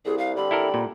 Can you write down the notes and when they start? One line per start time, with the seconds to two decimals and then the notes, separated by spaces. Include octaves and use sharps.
0.05 C2 G#4
0.18 F5
0.37 D3 G3 C4 B5
0.51 E4 A4 A#4
0.74 A#2